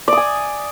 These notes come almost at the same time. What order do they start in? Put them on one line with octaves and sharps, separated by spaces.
D5 D#6 G#5